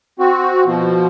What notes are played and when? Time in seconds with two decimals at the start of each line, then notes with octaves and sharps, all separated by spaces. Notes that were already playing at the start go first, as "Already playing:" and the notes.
0.20 C4 F#4
0.66 B2 F3